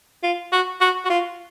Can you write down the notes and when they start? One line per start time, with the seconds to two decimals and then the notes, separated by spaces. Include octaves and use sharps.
0.23 F4
0.52 F#4
0.81 F#4
1.05 F#4
1.10 F4